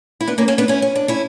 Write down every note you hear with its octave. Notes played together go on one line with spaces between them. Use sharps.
E4
B3 D4
A#3 C#4
A#3 C#4
B3 D4
C#4 E4
C#4
D4
C#4 E4